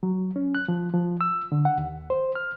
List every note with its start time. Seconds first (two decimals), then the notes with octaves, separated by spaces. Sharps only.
0.03 F#3
0.36 C#4
0.55 F#6
0.68 F3
0.93 F3
1.21 E6
1.52 D3
1.65 F#5
1.78 D#2
2.10 C5
2.35 F6